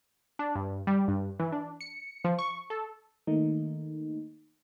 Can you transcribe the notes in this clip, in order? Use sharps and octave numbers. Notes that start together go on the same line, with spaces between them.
D4
G2
G3
G2
E3
D4
C#7
F3
C#6
A4
D#3 A3 A#3 D#4